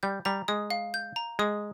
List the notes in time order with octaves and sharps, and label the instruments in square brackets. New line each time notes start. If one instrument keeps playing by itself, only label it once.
[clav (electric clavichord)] G3 [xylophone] G6
[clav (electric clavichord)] G3 [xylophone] A#5
[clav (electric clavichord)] G#3 [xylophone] D#6
[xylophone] F5
G6
A#5
[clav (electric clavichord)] G#3 [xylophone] D#6